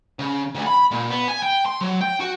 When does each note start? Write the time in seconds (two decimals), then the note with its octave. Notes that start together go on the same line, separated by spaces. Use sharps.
0.19 C#3
0.54 D2
0.66 B5
0.91 A#2
1.11 B3
1.28 G#5
1.43 G5
1.66 C6
1.81 F#3
2.01 G5
2.20 F#4